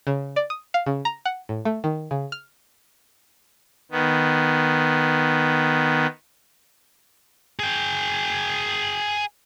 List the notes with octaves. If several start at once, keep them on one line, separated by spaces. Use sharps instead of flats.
C#3
D5
D#6
F5
C#3
A#5
F#5
A2
A3
D#3
C#3
F6
D#3 B3
G#4 G5